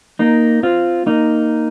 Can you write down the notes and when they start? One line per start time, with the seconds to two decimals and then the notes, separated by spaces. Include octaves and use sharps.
0.19 A#3 D#4
0.63 C4 F4
1.06 A#3 D#4